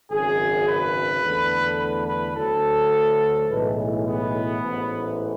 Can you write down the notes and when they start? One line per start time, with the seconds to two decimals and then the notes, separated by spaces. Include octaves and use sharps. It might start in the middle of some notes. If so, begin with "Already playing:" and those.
0.11 G#1 F#2 C#3 G#4
0.68 B4
1.24 E2 D3 A3
1.80 B4
2.08 B4
2.36 D2 D3 F#3 A3 A4
3.48 B1 A2 E3 G#3 B4
4.04 B3
4.61 A1 G#2 E3 A3